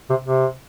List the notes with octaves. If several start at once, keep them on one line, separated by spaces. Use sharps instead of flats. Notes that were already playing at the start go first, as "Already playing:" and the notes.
C3
C3